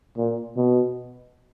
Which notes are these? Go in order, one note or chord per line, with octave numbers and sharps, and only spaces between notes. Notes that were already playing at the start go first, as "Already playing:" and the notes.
A#2
B2